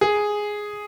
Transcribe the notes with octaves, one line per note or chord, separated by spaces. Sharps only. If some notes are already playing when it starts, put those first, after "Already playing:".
G#4